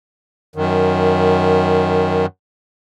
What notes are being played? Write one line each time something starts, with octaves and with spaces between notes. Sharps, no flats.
F#2 D#3